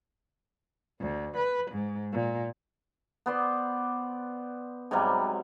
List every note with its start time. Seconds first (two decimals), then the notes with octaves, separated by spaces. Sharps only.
1.00 D2
1.37 B4
1.71 G#2
2.13 A#2
3.26 B3 C5 D5
4.91 G#2 C3 F#3 G3